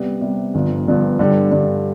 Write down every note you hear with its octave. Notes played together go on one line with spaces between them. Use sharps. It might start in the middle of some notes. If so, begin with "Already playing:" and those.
Already playing: C3 G3 B3
C3 G3 B3
G1 G2 F3 B3
G1 G2 F3 B3
G2 D3 G3
G2 D3 G3